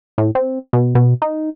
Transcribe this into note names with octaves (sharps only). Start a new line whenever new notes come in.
A2
C4
B2
B2
D#4